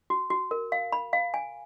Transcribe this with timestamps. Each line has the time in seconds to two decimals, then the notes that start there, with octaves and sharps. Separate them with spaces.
0.10 F#4
0.30 F#4
0.51 A#4
0.72 F5
0.92 B5
1.13 F5
1.34 G#5